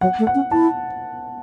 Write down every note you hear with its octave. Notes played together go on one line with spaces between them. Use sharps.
F#3 F#5
A3
F#5
C#4
E4 A5